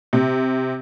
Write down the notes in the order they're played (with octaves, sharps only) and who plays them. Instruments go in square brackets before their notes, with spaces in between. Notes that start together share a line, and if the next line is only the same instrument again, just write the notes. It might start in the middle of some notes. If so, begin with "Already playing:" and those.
[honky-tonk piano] C3